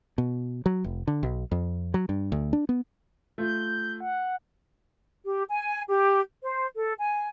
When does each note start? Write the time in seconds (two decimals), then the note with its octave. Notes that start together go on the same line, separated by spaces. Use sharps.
0.18 B2
0.66 F#3
0.84 F1
1.07 D3
1.23 B1
1.52 F2
1.94 F#3
2.09 G2
2.32 D2
2.53 D4
2.69 B3
3.38 A3 F4 G6
4.00 F#5
5.26 G4
5.50 G#5
5.89 G4
6.43 C5
6.77 A4
6.98 G#5